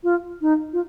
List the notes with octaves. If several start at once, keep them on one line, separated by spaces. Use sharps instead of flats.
F4
D#4
F4